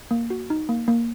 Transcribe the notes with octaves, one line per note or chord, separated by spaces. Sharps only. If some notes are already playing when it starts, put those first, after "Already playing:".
A#3
F#4
D#4
A#3
A#3